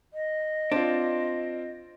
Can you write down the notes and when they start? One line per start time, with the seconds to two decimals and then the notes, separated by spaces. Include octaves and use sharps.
0.13 D#5
0.72 C4 D4 F4